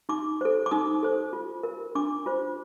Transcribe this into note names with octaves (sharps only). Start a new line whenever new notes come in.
D#4 D6
A4 C5
D6
D#4 D#6
A4 C5
F4
A#4
D4 D6
F4 C5